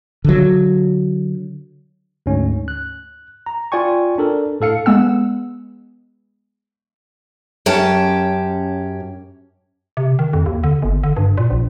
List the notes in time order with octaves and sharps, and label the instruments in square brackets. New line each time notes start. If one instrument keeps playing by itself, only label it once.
[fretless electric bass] D3 F#3
[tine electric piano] D2 G#2 C#4
F#6
A#5
F4 D5 G5 G#5 C#6
D4 A4 A#4
A2 A4 F5 C#7
[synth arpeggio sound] G#3 B3 F#5 E6
[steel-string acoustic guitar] F#2 C#4 G4 A5
[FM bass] C3
D#3
F2
D#2
D3
G1
D3
G2
A#2
A#1